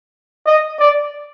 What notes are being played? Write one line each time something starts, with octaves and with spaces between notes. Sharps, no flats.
D#5
D5